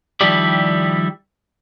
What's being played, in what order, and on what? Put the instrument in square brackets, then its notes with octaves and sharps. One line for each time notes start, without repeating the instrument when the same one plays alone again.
[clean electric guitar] D#3 F3 G3 E4 G4 D5